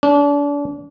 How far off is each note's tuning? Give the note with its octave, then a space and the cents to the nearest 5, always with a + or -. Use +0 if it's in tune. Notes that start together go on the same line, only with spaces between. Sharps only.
D4 -35